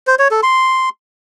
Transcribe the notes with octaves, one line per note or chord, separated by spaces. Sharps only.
C5
C#5
A4
C6